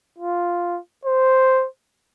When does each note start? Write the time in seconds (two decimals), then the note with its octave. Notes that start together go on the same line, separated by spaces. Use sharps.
0.18 F4
1.05 C5